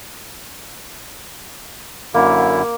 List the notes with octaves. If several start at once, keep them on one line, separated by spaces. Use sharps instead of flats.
F#2 D3 A#3 E4